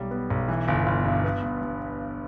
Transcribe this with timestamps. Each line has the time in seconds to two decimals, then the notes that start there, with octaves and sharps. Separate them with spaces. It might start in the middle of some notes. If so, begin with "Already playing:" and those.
Already playing: B1 G3
0.11 B3
0.30 B1
0.48 E3
0.68 G1
0.86 G1
1.05 G2
1.24 B3
1.42 G2
1.62 G2